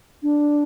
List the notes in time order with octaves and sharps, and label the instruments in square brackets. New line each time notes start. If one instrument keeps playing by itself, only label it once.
[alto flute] D4